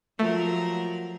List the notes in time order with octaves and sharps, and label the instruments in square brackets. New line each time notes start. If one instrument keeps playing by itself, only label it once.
[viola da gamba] F3 F#3 A#4 [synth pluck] A3